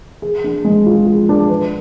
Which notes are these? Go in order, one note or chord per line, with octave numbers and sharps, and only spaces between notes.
G#4
D4
G#3
F4
G#4
D4
B4